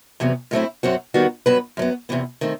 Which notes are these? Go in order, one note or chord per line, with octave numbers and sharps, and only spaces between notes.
E2 C3 F#3 B3
A2 F#3 A3 C4 E4
F#2 F#3 C4 F#4
D#2 D#3 G3 B3 F#4
G2 F#3 B3 F#4 B4
F#2 F#3 B3
E2 C3 E3 B3
D#3 A3 C4